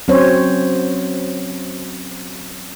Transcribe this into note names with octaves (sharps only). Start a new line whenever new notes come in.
F#3 C4 C#4 C5 C#5